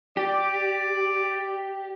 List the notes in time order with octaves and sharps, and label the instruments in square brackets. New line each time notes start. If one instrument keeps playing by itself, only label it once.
[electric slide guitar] G4 [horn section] D5